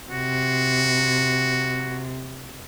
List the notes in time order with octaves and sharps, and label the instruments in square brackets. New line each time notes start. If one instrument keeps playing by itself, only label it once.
[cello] C3 [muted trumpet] F#4